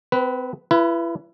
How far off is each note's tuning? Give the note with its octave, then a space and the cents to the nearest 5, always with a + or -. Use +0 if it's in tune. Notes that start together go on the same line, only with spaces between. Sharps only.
C4 -35 B4 +0
E4 +35 B4 -10